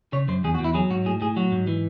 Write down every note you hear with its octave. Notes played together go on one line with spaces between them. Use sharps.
C#3 C#5
F#2 C5
E2 G#4
F#4
E2
E4
F#3 G#4
G#2 F#4
A2 G#4
A2 G#4
F#3 F#4
G#2
E3